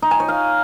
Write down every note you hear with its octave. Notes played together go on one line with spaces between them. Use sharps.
D#4
G#5
C#5
F5